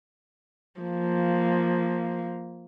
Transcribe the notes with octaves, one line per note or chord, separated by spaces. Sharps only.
F3 A#3